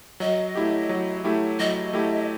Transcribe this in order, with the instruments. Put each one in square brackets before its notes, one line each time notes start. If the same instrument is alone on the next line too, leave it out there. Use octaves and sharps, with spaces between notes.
[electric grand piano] F#3 [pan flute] D#5
[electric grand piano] A3 E4 G4
F#3
A3 E4 G4
[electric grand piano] F#3 [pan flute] D#5
[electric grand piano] A3 E4 G4